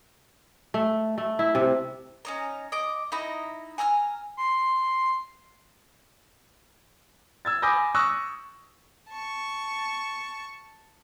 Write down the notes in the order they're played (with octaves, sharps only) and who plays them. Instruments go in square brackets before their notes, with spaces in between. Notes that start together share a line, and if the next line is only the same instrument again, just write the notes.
[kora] A3
A3
E4
C3
[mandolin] C#4 D#4 A#5
D#5 D6
D#4 E4 D#5 A#5
G#5 A#5 E6 F6
[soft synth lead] C6
[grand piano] E6 G#6 A6
G#5 B5 D6 D#6 G6 A#6
C#6 D#6 E6 F#6 A#6
[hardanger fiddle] A5 C#6